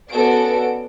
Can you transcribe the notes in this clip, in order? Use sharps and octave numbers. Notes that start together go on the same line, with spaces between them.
B3 C#4 F#4 A4 D5 D7